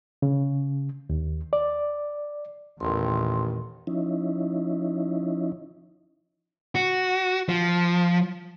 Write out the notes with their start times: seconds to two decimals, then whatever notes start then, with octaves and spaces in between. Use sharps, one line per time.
0.22 C#3
1.10 D#2
1.53 D5
2.80 A1 E2 A#2 D#3 C6
3.87 F3 C#4 D#4 E4
6.75 F#4
7.49 F3